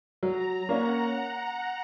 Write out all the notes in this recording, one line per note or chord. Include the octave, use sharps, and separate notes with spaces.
F#3 A#5
A#3 C#4 F#5